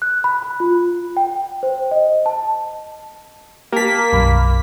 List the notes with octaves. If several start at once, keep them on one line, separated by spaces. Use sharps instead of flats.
F#6
B5
B5
F4
G5
C5
D#5
A5
A#3 G4 A5 B6
B1 F#2 B5